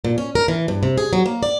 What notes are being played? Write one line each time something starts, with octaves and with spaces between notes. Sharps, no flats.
A#2
C#4
A#4
E3
G2
C3
G#4
F#3
A#3
D5